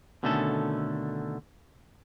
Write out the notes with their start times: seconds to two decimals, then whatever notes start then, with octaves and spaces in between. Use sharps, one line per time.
0.23 B2 D3 D#3 A3 C#4 A4